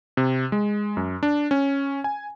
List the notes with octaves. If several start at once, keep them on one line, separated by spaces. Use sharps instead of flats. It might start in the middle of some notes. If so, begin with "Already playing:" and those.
C3
G#3
F#2
D4
C#4
G#5